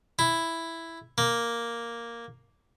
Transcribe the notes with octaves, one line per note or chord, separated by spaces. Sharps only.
E4
A#3